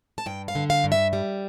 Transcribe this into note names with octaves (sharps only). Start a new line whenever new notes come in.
A5
G2 G5
F5
D3
F5
G2
E5
G3